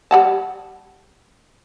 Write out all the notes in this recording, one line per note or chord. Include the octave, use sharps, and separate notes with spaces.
G3 F#5 A5